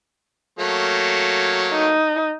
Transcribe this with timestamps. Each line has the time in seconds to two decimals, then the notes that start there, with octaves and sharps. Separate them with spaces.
0.59 F#3 A3 A#3
1.72 D#4